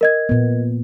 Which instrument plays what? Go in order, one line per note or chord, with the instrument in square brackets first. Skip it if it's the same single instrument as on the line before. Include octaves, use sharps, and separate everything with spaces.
[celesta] A#4 D#5 G#6
[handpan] A#2 B3